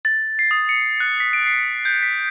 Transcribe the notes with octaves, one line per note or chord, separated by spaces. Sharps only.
A6
C7
D#6
C#7
F#6
B6
D7
C7
G6
B6